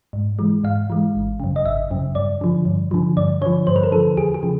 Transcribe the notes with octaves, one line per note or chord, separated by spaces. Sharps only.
G#2
E3 G#3
G#2 F5
E3 G#3
G#1
F#2 C#3
D#5
G#1 E5
F#2 C#3
G2 D5
D3 F3
G2
D3 F3
G2 D5
D3 F3 C#5
G2 C5
B4
A#4
D3 F3 A4
E2 G#4
G#4
C#3 F3